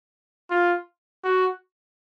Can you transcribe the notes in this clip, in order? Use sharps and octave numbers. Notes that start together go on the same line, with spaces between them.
F4
F#4